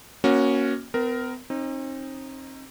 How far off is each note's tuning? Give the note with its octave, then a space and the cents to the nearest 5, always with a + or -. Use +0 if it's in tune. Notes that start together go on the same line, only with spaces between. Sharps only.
A#3 +30 C#4 +0 F#4 +0
B3 +45 A#4 +0
C4 +40 D#4 -5